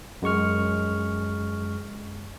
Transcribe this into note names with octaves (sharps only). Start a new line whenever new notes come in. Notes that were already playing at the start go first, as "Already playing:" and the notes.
F#2 G#3 C#6 F6